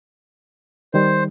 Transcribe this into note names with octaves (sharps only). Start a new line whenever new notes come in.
D#3 G3 C5